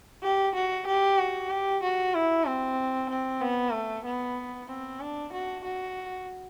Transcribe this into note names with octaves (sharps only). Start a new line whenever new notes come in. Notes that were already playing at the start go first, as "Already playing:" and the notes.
G4
F#4
G4
F#4
G4
F#4
E4
C4
C4
B3
A3
B3
C4
D4
F#4
F#4